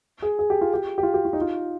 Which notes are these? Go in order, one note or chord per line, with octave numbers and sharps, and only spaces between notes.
G#4
G#4
G4
F4
G4
G4
F4
G4
F4
D#4
F4